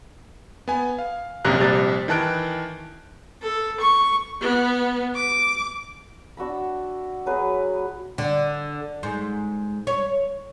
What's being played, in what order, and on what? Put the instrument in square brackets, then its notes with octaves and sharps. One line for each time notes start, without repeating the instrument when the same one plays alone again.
[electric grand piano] B3 G#5
F5
A#1 F#2 C3 A#5 F#6
A#1 C3 G3 A6
D#3 E3 A5 F#6 D7
[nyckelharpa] A4
C#6
[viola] B3
D6
[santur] D4 F#4 E5 B5
F#3 G#4 B4 F#5
[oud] D3
G#2
C#5